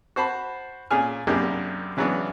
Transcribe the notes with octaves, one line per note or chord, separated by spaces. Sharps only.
F#4 C5 A5 B5
A#2 C#4 G#4 G#5 F6
C2 F#2 A#3 D4 G4 G#4
C#3 E3 F#3 G#3 B3 D4